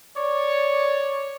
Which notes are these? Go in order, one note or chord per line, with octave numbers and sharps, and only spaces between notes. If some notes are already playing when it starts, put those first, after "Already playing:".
C#5 D5